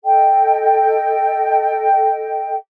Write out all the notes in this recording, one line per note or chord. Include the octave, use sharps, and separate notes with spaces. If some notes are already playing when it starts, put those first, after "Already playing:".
A4 D#5 G5